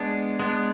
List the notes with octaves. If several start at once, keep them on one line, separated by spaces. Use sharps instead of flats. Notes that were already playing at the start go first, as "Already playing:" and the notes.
Already playing: G#3 B3 D4
G#3 B3 D4